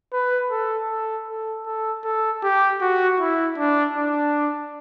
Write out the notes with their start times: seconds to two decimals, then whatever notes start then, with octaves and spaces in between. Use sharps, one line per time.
0.13 B4
0.51 A4
0.89 A4
1.28 A4
1.66 A4
2.04 A4
2.43 G4
2.81 F#4
3.20 E4
3.58 D4
3.97 D4